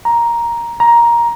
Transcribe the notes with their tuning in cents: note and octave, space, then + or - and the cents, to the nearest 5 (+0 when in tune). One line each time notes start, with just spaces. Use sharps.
A#5 +10
A#5 +15